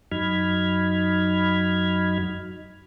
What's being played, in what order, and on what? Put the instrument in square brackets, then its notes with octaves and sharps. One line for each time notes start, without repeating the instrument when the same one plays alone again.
[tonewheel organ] F#2 F#3 D#4 B5 F6 G#6